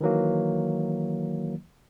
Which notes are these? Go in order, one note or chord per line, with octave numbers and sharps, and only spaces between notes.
D#3 E3 F#3 A#3